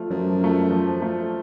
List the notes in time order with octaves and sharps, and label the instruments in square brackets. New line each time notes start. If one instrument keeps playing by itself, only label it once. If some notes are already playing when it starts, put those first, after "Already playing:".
Already playing: [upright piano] F3 A3 F4
[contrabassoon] F#2 [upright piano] F3
[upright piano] A3 F4
F3
A3 F4